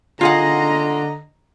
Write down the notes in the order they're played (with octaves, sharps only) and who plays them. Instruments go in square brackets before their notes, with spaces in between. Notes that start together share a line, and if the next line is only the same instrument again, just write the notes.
[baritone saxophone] D3 [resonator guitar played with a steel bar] F4 G#4 F#5 [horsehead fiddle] D#5 A#5